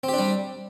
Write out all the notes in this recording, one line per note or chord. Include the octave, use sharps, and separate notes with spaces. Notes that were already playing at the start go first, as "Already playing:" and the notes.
G3 C4 D4 G4